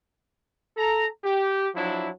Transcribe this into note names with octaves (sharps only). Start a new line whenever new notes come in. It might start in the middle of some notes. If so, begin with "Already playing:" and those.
A4 A#5
G4
F3 F#3 D4 E4